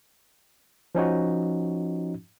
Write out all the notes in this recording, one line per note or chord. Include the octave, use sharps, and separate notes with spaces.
F3 C#4 D#4 F#4